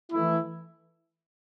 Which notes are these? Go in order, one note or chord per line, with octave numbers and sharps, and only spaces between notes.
E3 A3 E4